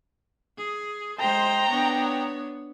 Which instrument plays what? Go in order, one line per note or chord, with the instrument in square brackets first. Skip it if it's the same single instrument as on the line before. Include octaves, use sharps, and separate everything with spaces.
[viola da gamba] G#4
[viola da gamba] G#3 C5 [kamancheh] G5 A#5
[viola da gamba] B3 D4 C#5